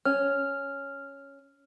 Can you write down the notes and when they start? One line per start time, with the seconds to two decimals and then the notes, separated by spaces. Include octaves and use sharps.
0.05 C#4 F6